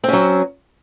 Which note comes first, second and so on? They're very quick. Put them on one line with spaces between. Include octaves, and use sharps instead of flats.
C4 C#4 F#3